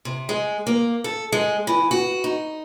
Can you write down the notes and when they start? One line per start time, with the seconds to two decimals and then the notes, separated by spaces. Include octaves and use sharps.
0.05 C3
0.29 G#3
0.67 A#3
1.04 A4
1.32 G#3
1.67 E3
1.91 F#4
2.24 D#4